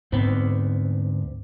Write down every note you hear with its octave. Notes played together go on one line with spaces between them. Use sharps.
D2 G#2 B3 C4